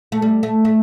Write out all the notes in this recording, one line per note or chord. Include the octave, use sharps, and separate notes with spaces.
A3
G3
A3
A3